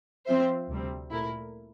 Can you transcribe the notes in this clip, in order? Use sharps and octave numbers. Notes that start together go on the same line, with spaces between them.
F3 C4 F4 C5 E5
D2 C3 G3 C4
A#2 A3 E4 A#4